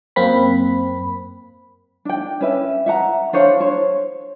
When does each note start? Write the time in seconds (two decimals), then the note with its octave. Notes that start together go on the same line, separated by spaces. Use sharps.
0.16 F#2 A#3 C4 B5
2.05 D4 G5
2.41 C#4 B4 E5
2.86 E5 F#5 A#5
3.33 D4 C5 C#5 F5
3.60 C5 C#5